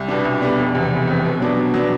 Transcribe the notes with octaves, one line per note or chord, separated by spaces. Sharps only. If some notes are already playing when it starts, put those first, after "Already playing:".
Already playing: C2
B2 G3 B3 D4
C2
B2 G3 B3 D4
F1
E2 C3
F1
E2 C3
B2
F#3 B3 D4
B2
F#3 B3 D4